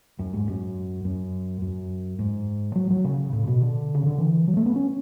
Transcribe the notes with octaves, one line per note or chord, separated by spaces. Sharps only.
F#2
G#2
F#2
F#2
F#2
G#2
F#3
F#3
C#3
A2
B2
D3
C#3
D3
E3
F#3
A3
B3
C#4